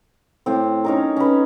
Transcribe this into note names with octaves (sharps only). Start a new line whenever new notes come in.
A2 C4
C#4 D#4 A#4
C#4 B4